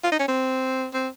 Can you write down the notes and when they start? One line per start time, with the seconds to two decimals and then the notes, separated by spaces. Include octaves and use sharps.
0.04 F4
0.12 D#4
0.19 C#4
0.28 C4
0.93 C4